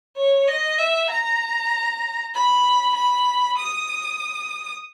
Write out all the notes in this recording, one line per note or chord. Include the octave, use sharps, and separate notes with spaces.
C#5
D#5
E5
A#5
B5
B5
D#6